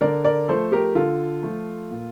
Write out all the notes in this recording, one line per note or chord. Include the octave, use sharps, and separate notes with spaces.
D3 A#4 D5
A#4 D5
F3 A3 A4 C5
G4 A#4
D3 F4 A4
F3 A3
A#2